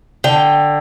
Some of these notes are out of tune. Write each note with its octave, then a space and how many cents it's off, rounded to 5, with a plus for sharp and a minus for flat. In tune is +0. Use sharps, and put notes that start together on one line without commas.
D3 +10 G5 +0